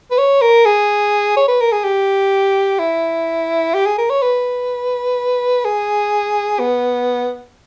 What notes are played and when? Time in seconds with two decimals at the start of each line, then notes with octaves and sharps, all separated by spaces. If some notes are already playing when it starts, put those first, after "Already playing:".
0.11 B4
0.18 C#5
0.42 A#4
0.65 G#4
1.37 C#5
1.48 B4
1.61 A#4
1.72 G#4
1.84 G4
2.79 E4
3.74 G4
3.86 G#4
3.98 A#4
4.10 C#5
4.22 B4
5.65 G#4
6.59 B3